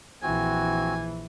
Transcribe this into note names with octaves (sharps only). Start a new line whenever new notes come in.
A#1 E3 C4 F#4 G#5